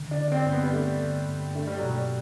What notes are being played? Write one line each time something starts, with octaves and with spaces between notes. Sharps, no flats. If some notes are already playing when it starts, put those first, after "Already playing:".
Already playing: D3
D4
D3
D4
C4
G2 C4
B3
G3
A3 D4
D3
G2
A3 D4
G3
B2 F#3
G3